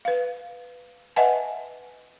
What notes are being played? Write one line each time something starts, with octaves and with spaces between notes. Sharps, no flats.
B4 F5
B4 D#5 E5 F#5 G#5 A5